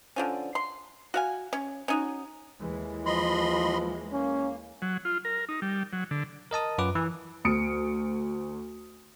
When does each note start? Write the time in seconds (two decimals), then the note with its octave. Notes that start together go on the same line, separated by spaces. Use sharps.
0.16 D3 F3 C#4
0.55 C6
1.14 F#4 F5 G#5
1.53 C#4
1.88 C#4 D#4 F#4
2.61 D#2 E3 G#3
3.06 F3 D#5 B5 C6
4.12 A#3 C#4
4.82 F#3
5.05 F4
5.25 A#4
5.49 D#4
5.62 G3
5.93 F#3
6.11 D3
6.51 A#4 D#5 A5 D#6
6.78 F#2 F4 B4 D6
6.95 E3
7.45 D2 D#6 C#7 D7